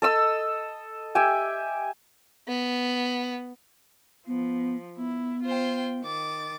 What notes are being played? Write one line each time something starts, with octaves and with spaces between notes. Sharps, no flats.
A4 D#5 E6
G4 E5 G5 G#5
B3
F3 B3
B3 E4
F4 C5 G5
D#3 D6 A6